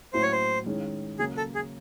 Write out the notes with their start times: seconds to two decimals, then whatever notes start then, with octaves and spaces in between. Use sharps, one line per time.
0.13 A2 F#3 A#3 C#4 E4 C5
0.23 C#5
0.32 C5
0.66 D#3 G#3 C#4 E4
1.19 C#3 F#3 A#3 C#4 G#4
1.37 A4
1.55 G#4